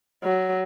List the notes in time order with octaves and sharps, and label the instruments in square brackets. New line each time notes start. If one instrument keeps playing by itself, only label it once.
[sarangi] F#3